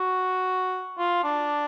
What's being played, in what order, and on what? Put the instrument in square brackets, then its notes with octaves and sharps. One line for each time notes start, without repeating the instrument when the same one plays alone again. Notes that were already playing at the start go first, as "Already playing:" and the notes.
Already playing: [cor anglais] F#4
F4
D4